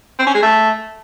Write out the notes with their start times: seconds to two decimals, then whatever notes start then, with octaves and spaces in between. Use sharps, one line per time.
0.19 C4
0.27 C#4
0.34 G#3
0.42 A3